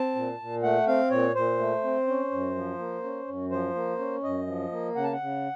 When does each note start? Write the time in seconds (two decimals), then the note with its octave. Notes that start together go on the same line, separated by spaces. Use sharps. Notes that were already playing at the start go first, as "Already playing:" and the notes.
Already playing: C4 A5
0.15 A#2
0.39 A#2
0.62 A3 F#5
0.87 C4 F5
1.11 A#2 C#5
1.35 A#2 C5
1.58 A3
1.83 C4
2.08 C#4
2.31 F#2
2.55 F3
2.79 A#3
3.04 C#4
3.28 F#2
3.51 F3 C5
3.75 A#3
3.99 C#4
4.23 F#2 D#5
4.47 F3
4.71 A#3
4.95 C#3 F#5
5.04 A5
5.12 F#5
5.20 C#3